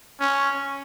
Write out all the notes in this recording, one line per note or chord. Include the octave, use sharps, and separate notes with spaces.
C#4